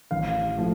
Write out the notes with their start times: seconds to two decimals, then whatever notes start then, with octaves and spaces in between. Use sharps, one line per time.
0.11 A1 F5
0.58 F3 A3